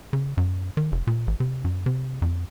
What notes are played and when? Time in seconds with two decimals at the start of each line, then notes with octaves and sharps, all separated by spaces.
0.13 C#3
0.37 F#2
0.77 D#3
0.92 F1
1.07 A#2
1.27 A1
1.40 C3
1.64 F#2
1.86 C3
2.22 F2